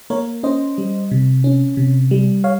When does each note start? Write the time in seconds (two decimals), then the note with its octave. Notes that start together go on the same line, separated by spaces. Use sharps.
0.10 A#3 A#4 C#5
0.43 C#4 C5 D#5
0.78 G3
1.11 C3
1.44 C#4
1.77 C3
2.11 G3
2.44 C#5 F5